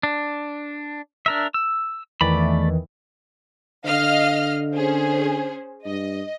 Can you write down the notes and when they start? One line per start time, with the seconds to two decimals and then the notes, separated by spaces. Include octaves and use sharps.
0.03 D4
1.26 D4 A#4 E5
1.54 E6
2.21 E2 D#3 E3 A3 D5 B5
3.85 D3 D#5 F5 F6
4.71 C#4 G#4 C5
5.85 G2 D#5